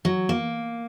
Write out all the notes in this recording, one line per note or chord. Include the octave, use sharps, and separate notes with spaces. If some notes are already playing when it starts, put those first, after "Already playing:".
F#3
A#3